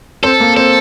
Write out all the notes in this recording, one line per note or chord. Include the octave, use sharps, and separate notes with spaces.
C4 A4
A#3
C4 A4